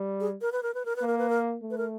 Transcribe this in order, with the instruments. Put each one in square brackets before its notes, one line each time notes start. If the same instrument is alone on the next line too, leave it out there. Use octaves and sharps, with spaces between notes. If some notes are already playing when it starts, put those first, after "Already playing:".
Already playing: [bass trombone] G3
[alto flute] G#4
A#4
B4
A#4
B4
A#4
B4
[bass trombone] A#3
[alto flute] A#4
B4
A#4
[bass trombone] A3
[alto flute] B4
A#4